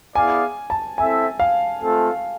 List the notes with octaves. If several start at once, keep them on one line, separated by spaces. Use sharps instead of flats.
B3 E4 G#4 D5 F5 G#5
A5
C4 E4 A4 E5 G#5
F5
A3 C4 F4 A4